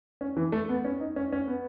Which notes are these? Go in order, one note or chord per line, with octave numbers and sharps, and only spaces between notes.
C#4
E3
A3
B3
C#4
D#4
C#4
C#4
B3